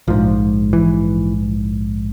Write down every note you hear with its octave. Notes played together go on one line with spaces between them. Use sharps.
A#1 G#2 F3
E3